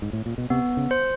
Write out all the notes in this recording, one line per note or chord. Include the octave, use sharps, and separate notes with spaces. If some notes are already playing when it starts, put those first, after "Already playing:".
G#2
A2
A#2
B2
C3 B3
C#3
C5